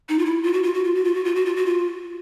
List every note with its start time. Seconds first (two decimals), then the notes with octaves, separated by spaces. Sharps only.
0.09 D#4
0.19 F4
0.26 E4
0.43 F4
0.53 F#4
0.63 F4
0.74 F#4
0.84 F4
0.95 F#4
1.04 F4
1.15 F#4
1.25 F4
1.35 F#4
1.46 F4
1.56 F#4
1.66 F4